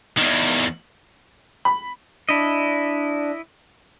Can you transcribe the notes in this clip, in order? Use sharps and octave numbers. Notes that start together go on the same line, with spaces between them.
E2 D#3
B5
D4 E4 D#5